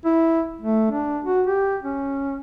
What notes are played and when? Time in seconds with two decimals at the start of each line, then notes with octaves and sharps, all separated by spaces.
0.05 E4
0.61 A3
0.91 D4
1.24 F#4
1.47 G4
1.83 C#4